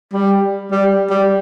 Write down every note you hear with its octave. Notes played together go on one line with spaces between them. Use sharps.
G3
G3
G3